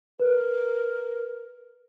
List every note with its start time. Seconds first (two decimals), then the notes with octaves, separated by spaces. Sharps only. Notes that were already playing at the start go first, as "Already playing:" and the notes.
0.20 A#4 B4